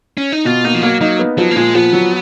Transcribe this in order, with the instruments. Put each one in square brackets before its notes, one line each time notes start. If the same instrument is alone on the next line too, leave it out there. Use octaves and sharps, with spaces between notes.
[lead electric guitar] C#4
D#4
[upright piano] B2 [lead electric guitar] F4
[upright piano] A#3 [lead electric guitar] D#4
[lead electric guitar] F3
[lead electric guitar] F#3 [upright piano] A#3
[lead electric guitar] F#3 [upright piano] D#4
[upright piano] B3
[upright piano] F3 [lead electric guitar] F#3
[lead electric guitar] A#3
[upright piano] A#2 [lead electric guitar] G#3
[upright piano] F3 [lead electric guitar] B3
[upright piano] F#3